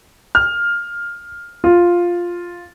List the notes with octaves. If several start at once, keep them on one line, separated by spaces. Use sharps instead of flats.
F6
F4